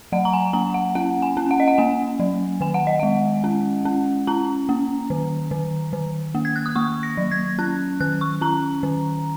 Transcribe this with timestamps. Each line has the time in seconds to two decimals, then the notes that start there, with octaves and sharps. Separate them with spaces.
0.12 F#3 F#5
0.25 A#5
0.33 G#5
0.53 A#3 A#5
0.74 F#5
0.95 C#4 F#5
1.22 G#5
1.37 C#4
1.51 F#5
1.60 D#5
1.68 F#5
1.78 A#3 G#5
2.19 F#3
2.61 D#3 G#5
2.74 F#5
2.87 D#5
2.99 G#3 F#5
3.44 C#4
3.85 C#4
4.27 C#4 A#5
4.69 A#3
5.10 D#3
5.51 D#3
5.93 D#3
6.35 A#3
6.45 G#6
6.56 F#6
6.66 D#6
6.76 A#3 C#6
7.03 A#6
7.17 F#3
7.31 G#6
7.59 C#4 F#6
8.00 D#3 F#6
8.21 C#6
8.41 C#4 A#5
8.83 D#3